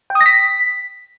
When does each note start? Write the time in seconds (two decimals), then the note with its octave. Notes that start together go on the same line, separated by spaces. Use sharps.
0.10 G5
0.15 D#6
0.21 A#6
0.26 B6